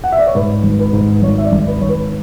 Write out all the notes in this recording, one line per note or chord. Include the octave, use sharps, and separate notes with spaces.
F#5
E5
D5
C#5
G#2 B4
G#1
B4
G#2
G#1 C#5
E5
D5
G#1
B4
G#1 C#5
B4